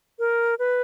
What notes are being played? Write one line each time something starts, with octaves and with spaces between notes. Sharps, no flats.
A#4
B4